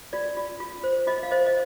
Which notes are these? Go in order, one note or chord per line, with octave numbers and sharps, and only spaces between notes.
F4 D5
F4
F4
C5
F4 D#5
F5
C5 D#5
D#5